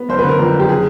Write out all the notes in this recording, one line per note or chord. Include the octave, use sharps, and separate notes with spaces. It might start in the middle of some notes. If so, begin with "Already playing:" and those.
Already playing: B3
F#1 C5
D3 B4
A#4
F2 A#4
F#1
G4
G#4